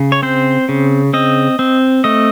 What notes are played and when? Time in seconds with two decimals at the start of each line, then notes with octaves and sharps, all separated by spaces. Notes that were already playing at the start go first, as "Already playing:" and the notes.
Already playing: C#3
0.12 C#5
0.23 C4 C5
0.69 C#3
1.13 C4 D#5
1.59 C4
2.04 A3 D#5